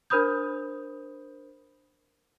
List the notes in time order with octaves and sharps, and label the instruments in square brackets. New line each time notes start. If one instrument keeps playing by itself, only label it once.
[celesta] D4 A#4 C5 B5 D#6 G6